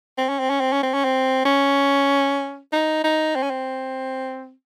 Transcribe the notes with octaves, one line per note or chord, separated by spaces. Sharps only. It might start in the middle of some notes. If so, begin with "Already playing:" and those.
C4
C#4
C4
C#4
C4
C#4
C4
C#4
C4
C#4
D#4
D#4
C4
C#4
C4